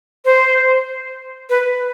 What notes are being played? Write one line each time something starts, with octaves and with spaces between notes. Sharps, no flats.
C5
B4